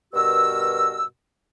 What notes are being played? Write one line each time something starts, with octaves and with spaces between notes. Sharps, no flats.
G2 B2 F#4 A#4 E6